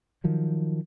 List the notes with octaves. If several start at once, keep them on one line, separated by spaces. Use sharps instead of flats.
D#3 F3 F#3